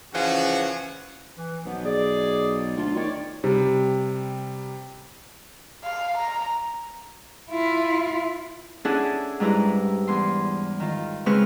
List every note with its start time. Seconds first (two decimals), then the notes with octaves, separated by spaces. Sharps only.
0.13 C#3 E3 F3 C#4 F#4
1.38 E3
1.66 B1 F3 B3
1.84 G#4 D5
2.77 D2 F4
2.96 D#3 C#5 D5
3.44 C3 G3
5.84 F5
6.17 A#5
7.51 E4 F4
8.85 C#4 D4 E4 G#4 A4 F#5
9.40 G#2 G3 E4 B4 A#5
10.08 E2 C6
10.80 D#3 F4
11.26 C#3 G#3 C4 B4 C#6 F6